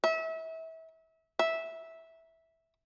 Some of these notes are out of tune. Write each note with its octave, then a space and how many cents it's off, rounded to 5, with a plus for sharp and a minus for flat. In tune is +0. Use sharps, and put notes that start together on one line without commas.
E5 -30
E5 -10